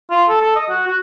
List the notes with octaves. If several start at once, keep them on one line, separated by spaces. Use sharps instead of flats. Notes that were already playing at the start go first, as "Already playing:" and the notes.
F4
A4
A4
D#5
F#4
F#4